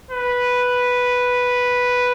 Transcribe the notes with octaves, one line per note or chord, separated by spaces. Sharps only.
B4